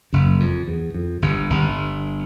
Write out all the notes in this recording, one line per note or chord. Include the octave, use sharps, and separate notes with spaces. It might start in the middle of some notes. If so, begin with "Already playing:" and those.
F#1 F#2
F2
E2
F2
G1 G2
G1 G2